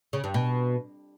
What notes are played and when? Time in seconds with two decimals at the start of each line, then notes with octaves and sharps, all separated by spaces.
0.13 C#3
0.24 G2
0.34 B2